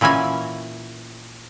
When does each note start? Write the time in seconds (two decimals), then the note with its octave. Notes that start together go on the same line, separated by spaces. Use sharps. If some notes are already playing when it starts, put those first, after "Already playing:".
0.01 A#2 E3 C#4 F#4 G#5